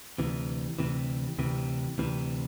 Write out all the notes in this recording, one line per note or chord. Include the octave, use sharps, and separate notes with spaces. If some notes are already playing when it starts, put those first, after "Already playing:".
D2 C3 E3
D2 C3 E3
D2 C3 E3
D2 C3 E3